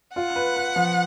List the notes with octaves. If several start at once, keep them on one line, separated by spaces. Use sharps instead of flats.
F4 F#5
B4
B4
F3